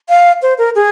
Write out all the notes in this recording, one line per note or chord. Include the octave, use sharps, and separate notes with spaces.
F5
C5
A#4
G#4